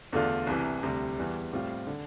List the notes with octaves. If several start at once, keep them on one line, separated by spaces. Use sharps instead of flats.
E2 D3 A3 D4 F4
C2 C3 E3
D2 C3 G3
E2 E3 G3
A2 G3 C4 F4
D3